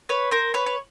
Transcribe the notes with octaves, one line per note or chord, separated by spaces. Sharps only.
B4 C#5
A#4 C5
B4 C#5
C#5